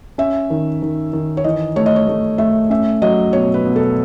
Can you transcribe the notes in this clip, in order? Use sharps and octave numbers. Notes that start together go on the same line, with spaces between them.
C#4 E5
D#3
D#3
D#3
C#5
E3 D#5
A3 C#5
D#5
C#5
A3
A3 E5
C#4 E5
F#3 D#5
B2 C#5
B4
B2
A4